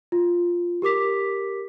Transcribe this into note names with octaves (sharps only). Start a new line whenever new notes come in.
F4
G4 A#4 D6 B6